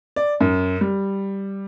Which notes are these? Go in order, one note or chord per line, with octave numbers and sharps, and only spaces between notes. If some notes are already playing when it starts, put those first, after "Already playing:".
D5
F#2
G3